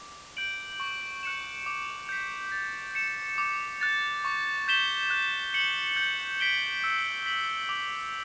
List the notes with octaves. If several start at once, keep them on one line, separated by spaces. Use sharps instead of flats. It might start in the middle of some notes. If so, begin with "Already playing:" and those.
Already playing: D6
G6 D7 F#7
C#6
F#6 C#7 E7
D6
G6 B6
A6
C#7 E7
D6
F#6 A6
C#6
G6 B6 E7 G7
F#6
C#7 F#7
G6
B6 D7 G7
E6
B6 F#7
D6